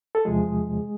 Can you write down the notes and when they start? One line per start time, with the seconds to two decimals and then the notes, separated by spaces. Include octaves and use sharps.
0.15 A4
0.25 E2 C3 F3 G#3 G#4